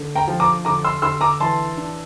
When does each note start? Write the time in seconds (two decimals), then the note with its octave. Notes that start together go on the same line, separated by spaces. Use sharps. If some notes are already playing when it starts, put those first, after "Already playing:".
Already playing: D3
0.15 G5 A#5
0.27 F3
0.40 A#5 D6
0.65 D3 A#5 D6
0.84 C6 E6
1.02 D3 C6 E6
1.21 A#5 D6
1.40 E3 A5 C6
1.77 D4